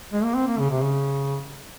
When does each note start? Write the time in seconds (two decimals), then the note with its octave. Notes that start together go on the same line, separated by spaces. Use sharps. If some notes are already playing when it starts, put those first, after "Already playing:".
0.13 G#3
0.24 A#3
0.35 C4
0.47 A#3
0.59 C#3
0.71 C3
0.82 C#3